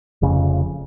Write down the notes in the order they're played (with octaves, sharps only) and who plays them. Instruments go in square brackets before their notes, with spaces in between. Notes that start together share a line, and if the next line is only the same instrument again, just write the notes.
[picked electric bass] F1 F2 C#3